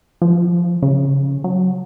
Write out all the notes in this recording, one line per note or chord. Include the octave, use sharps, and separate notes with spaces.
F3
C#3
F#3